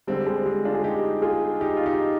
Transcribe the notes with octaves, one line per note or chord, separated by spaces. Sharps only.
D3 G3 G#3 C4
G#3 C4
G#3
D4 F4
G#4
D#4 G4
F4 G#4
D#4 G4
F4
D#4 G4